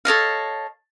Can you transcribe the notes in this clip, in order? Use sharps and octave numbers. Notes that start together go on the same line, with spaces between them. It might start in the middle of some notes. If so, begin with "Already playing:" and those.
A4 C#5 D#5 F5